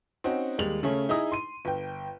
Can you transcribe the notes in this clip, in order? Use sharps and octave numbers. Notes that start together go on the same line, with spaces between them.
C4 C#4 D#4 F#4
D#2 G3 G#3 F7 F#7
C#3 A3 C#4
D#4 E4 G#4 A#5 D#6
C6 D#7
G1 G5